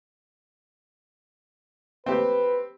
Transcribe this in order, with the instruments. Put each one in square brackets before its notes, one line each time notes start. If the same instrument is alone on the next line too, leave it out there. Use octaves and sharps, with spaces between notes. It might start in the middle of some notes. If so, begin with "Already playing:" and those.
[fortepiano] C4 G4 [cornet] B4